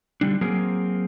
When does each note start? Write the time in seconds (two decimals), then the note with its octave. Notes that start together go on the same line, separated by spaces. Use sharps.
0.21 D3 G3 D4
0.41 F#3 A#3 C4 G#4 A#4